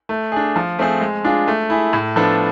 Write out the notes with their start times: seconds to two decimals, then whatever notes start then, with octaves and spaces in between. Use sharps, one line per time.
0.09 A3
0.32 D4 G#4
0.56 F3
0.79 A3 C4 G#4 C5
1.01 G#3
1.24 D4 F4 G#4
1.48 A3
1.70 E4 G#4
1.93 A2
2.16 F3 B3 D4 A4